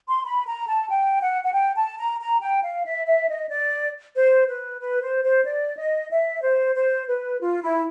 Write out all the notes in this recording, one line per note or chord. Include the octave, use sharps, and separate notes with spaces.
C6
B5
A#5
A5
G5
F#5
F#5
G5
A5
A#5
A#5
G5
F5
E5
E5
D#5
D5
C5
B4
B4
C5
C5
D5
D#5
E5
C5
C5
B4
F4
E4